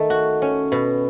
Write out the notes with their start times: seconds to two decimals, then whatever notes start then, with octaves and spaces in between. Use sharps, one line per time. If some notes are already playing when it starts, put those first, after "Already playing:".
Already playing: D#3 A3
0.10 F#4
0.42 C#4
0.72 B2